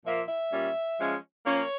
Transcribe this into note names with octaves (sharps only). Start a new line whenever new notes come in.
A#2 F3 A#3 E5
E5
A#2 G3 C#4
F3 G#3 C#4
F3 A#3 C#4 C#5